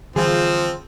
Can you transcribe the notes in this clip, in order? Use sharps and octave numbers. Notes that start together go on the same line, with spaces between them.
D3 E3 F3 G3 C4 F4 G#4